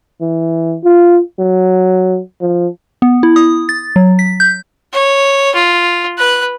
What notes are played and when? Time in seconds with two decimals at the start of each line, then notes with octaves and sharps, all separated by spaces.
0.21 E3
0.84 F4
1.39 F#3
2.41 F3
3.02 B3
3.23 E4
3.36 D#6
3.69 A6
3.96 F#3
4.19 B6
4.40 G6
4.92 C#5
5.54 F4
6.18 B4 F#6